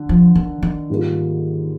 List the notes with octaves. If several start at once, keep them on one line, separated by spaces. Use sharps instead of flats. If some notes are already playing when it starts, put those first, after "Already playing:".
Already playing: D3
F3
D#3
D#3
G#2 G3 A#3 F4